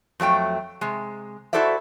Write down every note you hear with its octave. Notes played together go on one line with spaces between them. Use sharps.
F2 F#3 A3 G5
C3 G#3
E4 F#4 A4 C5 D5 E5